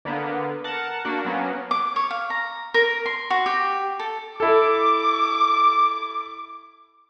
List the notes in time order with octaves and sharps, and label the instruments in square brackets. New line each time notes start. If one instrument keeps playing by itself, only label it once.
[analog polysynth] D3 A#3 B3
A#4 F#5 A5
A#3 D4 F#4
F#3 A#3 B3 C#4
[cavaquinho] D6
C#5
F5
A#5
A#4
C6
F#4
G4
A4
[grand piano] E4 A4 [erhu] D6